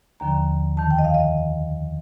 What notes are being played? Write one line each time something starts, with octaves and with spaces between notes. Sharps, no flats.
D#2 D3 F3 A#5
F2 D#3 A5
G5
D#5
F5
D#5